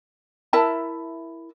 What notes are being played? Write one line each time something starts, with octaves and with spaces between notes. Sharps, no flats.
E4 A#4 E5 A5